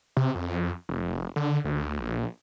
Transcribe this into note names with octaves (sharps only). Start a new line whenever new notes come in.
C3
F2
F1
D3
D2
A#1